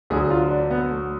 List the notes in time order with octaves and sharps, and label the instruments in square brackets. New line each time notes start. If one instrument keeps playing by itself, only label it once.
[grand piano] D2 D3 F#3 G#4
F4
D4
B3
A3